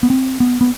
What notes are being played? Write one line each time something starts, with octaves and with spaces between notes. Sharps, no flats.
B3
C4
B3
B3